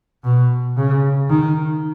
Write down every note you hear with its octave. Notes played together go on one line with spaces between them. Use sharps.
B2
C#3
D#3